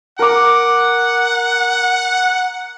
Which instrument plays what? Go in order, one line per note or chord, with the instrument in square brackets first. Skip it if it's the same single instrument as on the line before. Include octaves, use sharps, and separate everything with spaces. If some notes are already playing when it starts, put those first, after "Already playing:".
[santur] A#4 D6 [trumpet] F#5